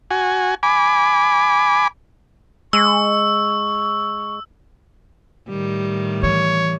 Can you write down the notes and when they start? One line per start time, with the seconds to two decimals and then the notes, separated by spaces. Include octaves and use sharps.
0.11 F#4 G#5
0.63 G#5 B5 D6
2.73 G#3 C#6 E6
5.49 A2 D#3 G3
6.23 E3 C#5